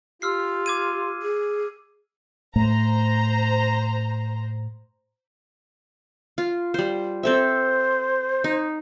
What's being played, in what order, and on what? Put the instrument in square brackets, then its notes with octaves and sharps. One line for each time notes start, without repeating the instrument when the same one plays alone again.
[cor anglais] F4 [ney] G4 [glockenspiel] E6 F6 C7
[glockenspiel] D6 G#6 D#7
[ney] G#4
[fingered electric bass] A2 A3 [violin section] C5 A#5
[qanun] F4
G3 C5
[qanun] C4 A4 E5 [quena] C5
[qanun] D#4